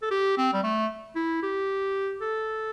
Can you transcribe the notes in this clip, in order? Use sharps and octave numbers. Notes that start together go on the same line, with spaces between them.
A4
G4
C4
G3
A3
E4
G4
A4